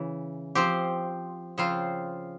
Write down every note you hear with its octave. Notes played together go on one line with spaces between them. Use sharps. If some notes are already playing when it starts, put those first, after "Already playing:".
Already playing: C#3 E3
F3 C4 G4
C#3 F3 C4 F4